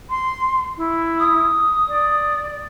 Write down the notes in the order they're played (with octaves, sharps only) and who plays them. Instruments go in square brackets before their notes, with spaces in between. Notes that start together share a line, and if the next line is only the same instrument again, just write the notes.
[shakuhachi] C6
E4
[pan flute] D#6
[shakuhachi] D5